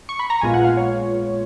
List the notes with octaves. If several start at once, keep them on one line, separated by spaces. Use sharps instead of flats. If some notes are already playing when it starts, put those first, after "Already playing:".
C#6
B5
A#5
A#1 A#2 G#3 B3 F4 G#5
F#5
F5
C#5